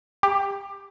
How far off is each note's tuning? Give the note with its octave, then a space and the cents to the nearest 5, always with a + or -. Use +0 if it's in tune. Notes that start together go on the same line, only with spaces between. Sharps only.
G4 +20